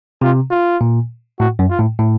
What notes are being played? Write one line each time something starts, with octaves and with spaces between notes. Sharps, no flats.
C3 F4
F4
A#2
A2 F#4
F#2
F4
A2
A2